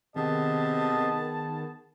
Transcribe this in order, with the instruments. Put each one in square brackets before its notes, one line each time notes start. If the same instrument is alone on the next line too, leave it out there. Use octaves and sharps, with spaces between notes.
[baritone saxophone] C3 [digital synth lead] D#3 [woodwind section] B3 G#4 A5 [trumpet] D#5